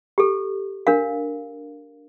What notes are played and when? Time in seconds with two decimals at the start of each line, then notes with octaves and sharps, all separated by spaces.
0.18 G4 A4
0.87 D4 A#4 F5